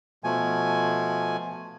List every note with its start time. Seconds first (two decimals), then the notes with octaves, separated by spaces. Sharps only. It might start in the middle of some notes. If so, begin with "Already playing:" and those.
0.24 B2 F3 A3 G#5